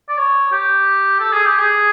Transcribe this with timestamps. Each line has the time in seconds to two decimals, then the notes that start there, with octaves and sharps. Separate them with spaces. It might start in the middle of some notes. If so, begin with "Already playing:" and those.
0.09 D5
0.18 C#5
0.52 G4
1.20 A4
1.33 G#4
1.45 G4
1.59 G#4